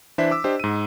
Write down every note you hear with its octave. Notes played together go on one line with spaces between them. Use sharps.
E3 D4 E4 C5 E5 B6
D6 E6
D4 G4 C5 D#5
G#2 D#7